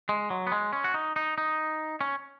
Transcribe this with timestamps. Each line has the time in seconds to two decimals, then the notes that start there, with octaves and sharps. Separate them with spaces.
0.09 G#3
0.30 F#3
0.47 B3
0.52 G#3
0.73 C#4
0.84 F#4
0.94 D#4
1.16 D#4
1.38 D#4
2.01 C#4